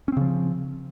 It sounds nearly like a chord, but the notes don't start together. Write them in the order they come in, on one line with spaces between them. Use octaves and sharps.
C#4 C4 C#3 F3